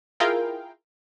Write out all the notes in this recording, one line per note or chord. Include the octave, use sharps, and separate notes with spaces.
E4 F4 G#4 A#4 F5 G5